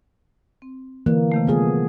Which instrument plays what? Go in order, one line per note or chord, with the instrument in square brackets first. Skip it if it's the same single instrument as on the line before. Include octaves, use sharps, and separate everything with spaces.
[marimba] C4
[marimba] D3 [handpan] E3 A#3
[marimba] C3 D#3 A3
[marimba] G3 F4 A4 [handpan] B3 G#4